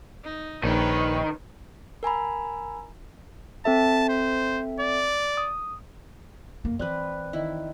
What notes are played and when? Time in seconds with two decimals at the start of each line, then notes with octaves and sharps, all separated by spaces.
0.24 D#4
0.64 A#1 D#3 B4 C#5
2.03 A#4 G#5 A#5 B5
3.65 C4 A4 E5 A5
4.09 C5
4.80 D5
5.37 D#6
6.65 F#2 A#3
6.79 E3 C4 B4 D5 F#6
7.33 D#3 E4